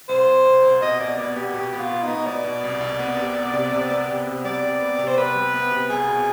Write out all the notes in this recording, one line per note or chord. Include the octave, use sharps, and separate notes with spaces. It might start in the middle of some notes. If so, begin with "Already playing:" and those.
C2 C5
C2
C2
C2
B2 D#5
B2 D5
B3 D5
B3 G4
B2 G4
B3
F4
B3
D#4
B3
B3 D5
B2
C2
C2
B3
C3
B3
C3
C3
B3
C3
C3
G3 D5
C3
B3
C3
C5
C3 B4
G3
B3
C3
C2 G#4
B2